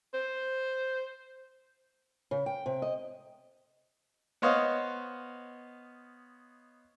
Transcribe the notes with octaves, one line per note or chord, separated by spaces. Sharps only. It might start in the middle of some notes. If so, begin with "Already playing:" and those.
C5
C#3
G5
C3
D#5
B3 C5 C#5 D#5 F5